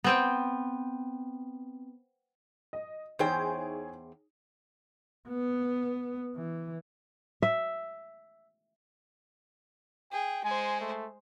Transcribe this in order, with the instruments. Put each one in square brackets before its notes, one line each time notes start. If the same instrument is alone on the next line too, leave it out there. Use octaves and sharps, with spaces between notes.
[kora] B3 C4 G5
[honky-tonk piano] D#5
[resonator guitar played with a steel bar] E2 C5 G5 [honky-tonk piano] D#4 G#4 C#5
[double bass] B3
E3
[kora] E5
[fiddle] G#4 [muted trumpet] G5
[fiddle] G#3 C5 [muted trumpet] G#5
[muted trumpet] A3